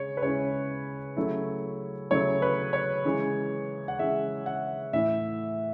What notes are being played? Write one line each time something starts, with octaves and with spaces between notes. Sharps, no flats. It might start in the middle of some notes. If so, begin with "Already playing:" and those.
Already playing: C#3 G#3 C#5
B4
C#3 G#3 C#4 E4 C#5
C#3 F#3 A3 E4
C#3 F#3 A3 E4 C#5
B4
C#5
C#3 E3 G#3
F#5
C#3 E3 G#3 E5
F#5
A2 E3 E5